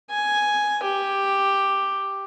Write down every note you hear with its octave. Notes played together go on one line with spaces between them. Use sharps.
G#5
G4